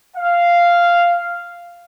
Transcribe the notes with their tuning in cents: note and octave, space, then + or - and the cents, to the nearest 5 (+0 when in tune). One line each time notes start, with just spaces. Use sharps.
F5 -5